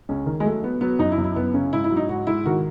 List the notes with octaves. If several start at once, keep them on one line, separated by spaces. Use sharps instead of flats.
C#2 C#4
D#3
G#3
F#3 A3
F#3 B3
F#3 B3
F#2 D#4
E4
F#2
E4
F#2 B3
C#3 C#4
G#2 E4
E4
F#3
D#4
G#2 F#4
G#2 E4
D#3 F#4